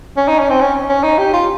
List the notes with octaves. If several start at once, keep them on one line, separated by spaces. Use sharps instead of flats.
C#4
D#4
C#4
C4
C#4
C#4
D#4
G4
F4